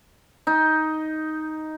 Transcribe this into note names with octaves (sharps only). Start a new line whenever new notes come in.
D#4